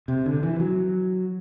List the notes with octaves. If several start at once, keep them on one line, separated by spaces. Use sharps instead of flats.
C3
D3
E3
F#3